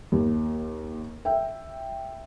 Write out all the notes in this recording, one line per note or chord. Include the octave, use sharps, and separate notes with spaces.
D#2
E5 G5